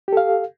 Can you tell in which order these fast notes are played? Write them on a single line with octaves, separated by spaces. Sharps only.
G4 A4 F5